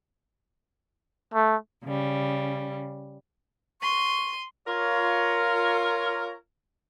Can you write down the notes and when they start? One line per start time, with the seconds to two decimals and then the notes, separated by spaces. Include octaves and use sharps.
1.34 A3
1.84 C#3 G3
3.82 C6 C#6 D#7
4.67 F4 A#4 C#5